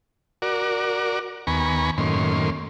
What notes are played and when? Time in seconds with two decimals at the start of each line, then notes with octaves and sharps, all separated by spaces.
0.42 F#4 A#4 D5
1.47 D#2 B3 G#5 A#5 B5 C#6
1.98 F#2 A2 D#3 A#3 C#4 C6